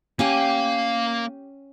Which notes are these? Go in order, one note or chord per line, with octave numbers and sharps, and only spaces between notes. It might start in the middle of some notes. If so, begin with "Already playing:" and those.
A#3 C#4 G4 F5 G#5